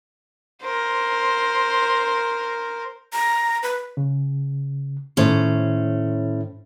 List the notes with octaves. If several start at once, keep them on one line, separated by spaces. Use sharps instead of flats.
A#4 C5
A#5
B4
C#3
A2 D#3 C#4 A4 C5